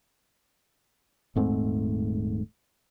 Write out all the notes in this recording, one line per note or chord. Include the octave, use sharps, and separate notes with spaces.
D#1 G#2 A3 C4